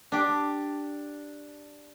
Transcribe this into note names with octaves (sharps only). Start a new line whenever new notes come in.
D4 G4